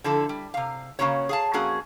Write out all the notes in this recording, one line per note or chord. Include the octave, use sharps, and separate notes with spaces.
D3 F3 E4 A4
G3
C3 F5
C#3 F3 A#3 C#4 F#4 C#5
G#4 F5 A5
F2 A#3 C#4 F#4 G#4